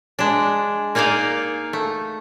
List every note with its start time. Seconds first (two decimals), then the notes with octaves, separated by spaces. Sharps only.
0.19 G#3 D4
0.95 A#3 D#4 G#4 D5 F5
1.73 A3